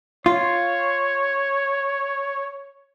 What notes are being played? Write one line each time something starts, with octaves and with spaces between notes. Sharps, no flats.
F4 C#5